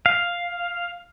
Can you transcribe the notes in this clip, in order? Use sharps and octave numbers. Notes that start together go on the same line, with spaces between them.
F5